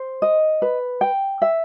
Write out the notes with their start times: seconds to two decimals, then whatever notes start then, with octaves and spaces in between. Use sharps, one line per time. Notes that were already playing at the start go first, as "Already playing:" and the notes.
Already playing: C5
0.22 D#5
0.62 B4
1.01 G5
1.42 E5